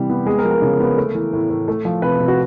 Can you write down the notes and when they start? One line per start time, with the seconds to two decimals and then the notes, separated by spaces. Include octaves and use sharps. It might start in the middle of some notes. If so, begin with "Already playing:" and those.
Already playing: C3 E3 G3 G4
0.10 B3
0.26 G#3 G#4
0.38 A#4
0.44 F3
0.51 A#4
0.62 C#3
0.80 B3
0.98 A3
1.14 E3
1.33 A2
1.50 A2
1.68 A3
1.85 F3
2.02 C3 B4
2.20 C3
2.28 F#4